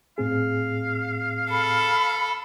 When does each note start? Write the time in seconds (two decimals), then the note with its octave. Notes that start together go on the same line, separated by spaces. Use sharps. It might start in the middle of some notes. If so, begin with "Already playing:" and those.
0.18 A2 C4 G#4 F5
1.51 A4 B5